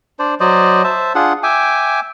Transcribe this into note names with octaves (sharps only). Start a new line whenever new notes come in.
D4 C5 D5
F#3 C5 D5 D#5
C5 E5 A5
D4 F4 G#4 F#5
E5 G5 G#5 D6